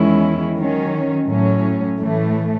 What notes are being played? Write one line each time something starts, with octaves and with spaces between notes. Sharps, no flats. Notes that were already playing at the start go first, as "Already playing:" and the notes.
Already playing: E2 D#3 G#3 C#4 E4
D#3 F#3 C#4
A2 F#3 C#4
A2 E3 A3